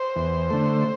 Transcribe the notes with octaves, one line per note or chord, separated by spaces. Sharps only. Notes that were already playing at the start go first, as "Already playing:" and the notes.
Already playing: C5
E2
D3 A3